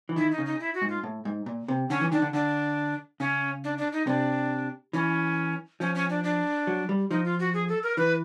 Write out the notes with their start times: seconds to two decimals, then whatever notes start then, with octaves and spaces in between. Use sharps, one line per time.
0.09 E3
0.16 D#3 E4
0.31 D#4
0.38 C#3
0.46 D#4
0.60 E4
0.74 F#4
0.82 G#2
0.89 F4
1.04 A2
1.25 G#2
1.46 A#2
1.68 C3
1.90 D3 C#4
2.01 E3
2.11 D#3 D4
2.22 D3
2.33 D3 D4
3.20 C#3 C#4
3.64 D4
3.78 D4
3.93 D#4
4.07 C3 D4
4.93 E3 C#4
5.80 F3 C#4
5.95 C#4
6.10 D4
6.24 D4
6.67 F#3
6.89 G3
7.11 F3 D#4
7.25 F4
7.40 F#4
7.54 G#4
7.69 A4
7.83 A#4
7.97 E3 B4